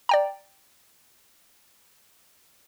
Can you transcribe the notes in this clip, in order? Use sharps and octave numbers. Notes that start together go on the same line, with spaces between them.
D5 G5 A#5